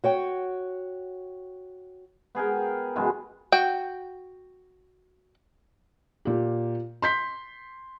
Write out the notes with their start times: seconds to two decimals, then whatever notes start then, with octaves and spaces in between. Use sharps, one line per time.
0.04 F#4 C#5 G5
2.35 B3 G#4 A#4 G5
2.96 F#2 B2 E3 G#3
3.52 F#4 G5
6.25 A#2 G4
7.02 C6 G6 B6